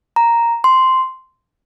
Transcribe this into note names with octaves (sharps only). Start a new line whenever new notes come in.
A#5
C6